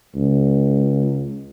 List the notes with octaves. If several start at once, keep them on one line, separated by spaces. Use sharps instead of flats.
C#2